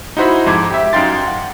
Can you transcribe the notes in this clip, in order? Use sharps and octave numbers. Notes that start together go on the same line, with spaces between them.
D#4 E4 F#4 C5 E5 B5
F2 G#2 D6 G#6
G4 E5
F#2 D#4 F5 G5 C6 A6
F#5